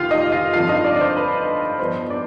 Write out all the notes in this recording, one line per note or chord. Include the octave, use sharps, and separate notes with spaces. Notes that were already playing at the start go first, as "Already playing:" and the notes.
Already playing: F1 D#2 D3 F4 G4 F5
D#4 D#5
F4 F5
G2 D3 F3 C4 F4 F5
D#4 D#5
D4 D5
D5
C5
B4
G2 F3 B3 C5
D4 D5